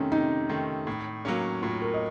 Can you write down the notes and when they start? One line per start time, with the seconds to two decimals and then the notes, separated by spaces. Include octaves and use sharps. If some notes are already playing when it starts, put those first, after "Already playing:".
Already playing: C3 D#3 A3 C4 C#4 D#4
0.12 C3 D#4
0.49 D#3 A3 C4
0.87 A2
1.25 F#3 A#3 C#4
1.62 A2 F4
1.82 A#4
1.94 D#5